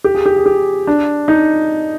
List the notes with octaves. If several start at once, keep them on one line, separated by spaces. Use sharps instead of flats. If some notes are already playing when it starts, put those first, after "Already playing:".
G4
G#4
G4
G#4
G4
D4
D#4